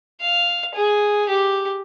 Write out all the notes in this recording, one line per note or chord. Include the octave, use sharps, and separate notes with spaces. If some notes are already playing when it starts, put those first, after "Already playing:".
F5
G#4
G4